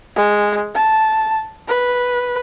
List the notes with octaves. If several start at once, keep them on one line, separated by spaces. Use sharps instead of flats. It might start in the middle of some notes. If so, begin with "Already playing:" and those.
G#3
A5
B4